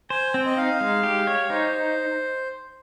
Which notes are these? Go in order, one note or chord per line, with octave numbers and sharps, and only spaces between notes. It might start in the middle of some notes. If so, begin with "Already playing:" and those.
C5 G#5
C4 G5
D#5
D#4 F5
G#3
G4
C#5
D#4 C5